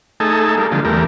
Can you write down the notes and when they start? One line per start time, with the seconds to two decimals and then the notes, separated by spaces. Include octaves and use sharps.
0.20 A3 D#4 G#4 A4
0.57 G3 A#3
0.72 D3 F3 G3 G#3
0.85 E2 G3 A3 A#4